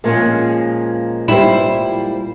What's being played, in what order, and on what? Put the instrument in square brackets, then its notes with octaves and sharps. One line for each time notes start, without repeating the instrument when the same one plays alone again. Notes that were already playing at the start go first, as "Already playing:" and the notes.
[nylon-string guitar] A#2 F3 C#4 [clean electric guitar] G#3
[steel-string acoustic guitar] G3 C5 [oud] E4